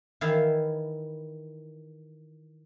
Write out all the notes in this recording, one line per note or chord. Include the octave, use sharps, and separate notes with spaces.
D#3 E3 E4 F5